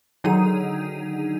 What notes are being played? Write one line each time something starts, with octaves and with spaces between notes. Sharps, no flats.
D3 D#3 F#3 D#4 G#4 D#7